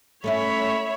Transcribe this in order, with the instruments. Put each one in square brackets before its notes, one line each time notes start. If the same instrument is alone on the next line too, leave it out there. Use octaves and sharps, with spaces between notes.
[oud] A3 C#4 E4 [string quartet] C#5 E5 B5